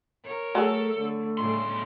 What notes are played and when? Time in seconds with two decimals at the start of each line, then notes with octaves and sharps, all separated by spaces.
0.23 A#4 C#5
0.55 F#3 A3 G#4 A4
0.97 D3 A3
1.38 B1 A2 C#3 G3 C6